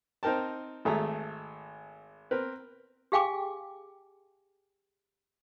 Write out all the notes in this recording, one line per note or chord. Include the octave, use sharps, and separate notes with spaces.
C4 D#4 A#4 G5 A5
G#1 A3 G#4 A#5
C4 A#4 B4
G4 G#4 F5 G5 G#5 D6